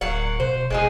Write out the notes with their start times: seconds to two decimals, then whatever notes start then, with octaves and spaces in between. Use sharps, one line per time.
0.01 D1 F#3 A#3 F#5
0.40 B2 C5
0.70 F1 G#3 D#4 G#4